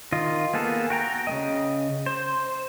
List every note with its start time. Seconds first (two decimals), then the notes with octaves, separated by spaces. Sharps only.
0.12 D#3 F4 D#5
0.54 A#3 B3 G#4 A4
0.90 F#4 G5 A#5
1.27 C#3 A#3 D#5
2.06 C5